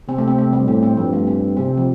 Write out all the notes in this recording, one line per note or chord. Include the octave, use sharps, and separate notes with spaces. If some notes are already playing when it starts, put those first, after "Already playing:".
C3 C4
A3
C4
A3
G3
A2 C4
C4
G2 F3
A3
C4
C3 C4
F3